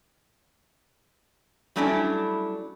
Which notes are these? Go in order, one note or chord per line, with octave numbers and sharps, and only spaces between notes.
F#3 G3 A3 C#4 D4 E4